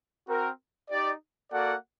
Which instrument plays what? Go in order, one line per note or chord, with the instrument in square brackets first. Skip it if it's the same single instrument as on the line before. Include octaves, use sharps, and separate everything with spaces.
[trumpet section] C4 F#4 A#4
D#4 G4 D5
A#3 F#4 A4 D5 F#5